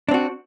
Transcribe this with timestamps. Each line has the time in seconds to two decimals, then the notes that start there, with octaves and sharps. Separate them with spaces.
0.09 D4
0.11 C4
0.14 F#4